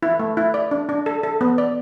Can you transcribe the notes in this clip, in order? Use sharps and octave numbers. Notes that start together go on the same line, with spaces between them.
E4
A3
E4
D5
D4
D4
A4
A4
B3
D5